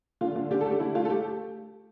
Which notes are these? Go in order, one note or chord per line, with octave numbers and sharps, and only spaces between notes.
D3 F4
D3 F4
D3 G4
A4
A3 G4
D3 E4
A3 F4
A4
A3 G4